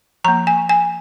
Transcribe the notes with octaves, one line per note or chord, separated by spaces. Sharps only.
F3 A#3 A#5
G#5
G#5